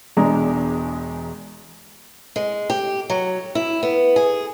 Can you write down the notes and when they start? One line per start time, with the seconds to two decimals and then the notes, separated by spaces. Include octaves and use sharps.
0.17 E1 E2 G#3 D4 A#5
2.36 G#3
2.70 G4
3.10 F#3
3.55 E4
3.83 B3
4.16 G#4